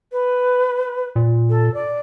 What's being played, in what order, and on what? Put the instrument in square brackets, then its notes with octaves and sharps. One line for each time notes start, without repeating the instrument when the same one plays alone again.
[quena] B4
[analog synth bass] A#2
[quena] A4
D5